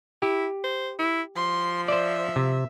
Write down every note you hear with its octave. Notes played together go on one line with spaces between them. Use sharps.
E4 G4
C5
E4
F3 C6
C5 D5 E5
C3